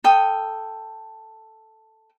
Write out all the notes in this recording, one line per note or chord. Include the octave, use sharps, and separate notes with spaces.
A4 G5 D#6